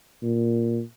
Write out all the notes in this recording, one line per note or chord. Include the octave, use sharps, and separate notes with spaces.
A#2